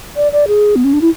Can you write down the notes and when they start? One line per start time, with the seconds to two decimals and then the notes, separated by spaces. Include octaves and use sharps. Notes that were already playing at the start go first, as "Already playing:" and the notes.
0.16 D5
0.32 D5
0.48 G#4
0.76 B3
0.84 C#4
0.93 D4
1.01 E4